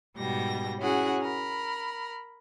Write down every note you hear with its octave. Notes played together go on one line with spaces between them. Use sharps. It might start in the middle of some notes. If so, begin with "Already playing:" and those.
G#2 B2 G3 G5 A#6
C#4 E4 F#4 G#4 F#5
A#4 B5